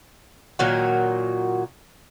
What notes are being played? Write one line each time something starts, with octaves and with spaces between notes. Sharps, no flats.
A#2 D#3 F#3 F#4